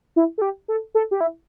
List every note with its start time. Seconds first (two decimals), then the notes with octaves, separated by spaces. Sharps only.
0.16 E4
0.38 A4
0.42 G4
0.68 A4
0.95 A4
1.11 G4
1.21 E4